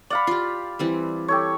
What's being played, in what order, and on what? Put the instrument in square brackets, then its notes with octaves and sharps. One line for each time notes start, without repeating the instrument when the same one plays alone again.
[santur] D5 F5 B5 [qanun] F#5
[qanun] F4 G4
E3 G3 C4
[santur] G4 A4 C#5